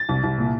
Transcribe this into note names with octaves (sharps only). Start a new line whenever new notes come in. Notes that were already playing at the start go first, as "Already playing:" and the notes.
Already playing: A6
C2
C2
A#2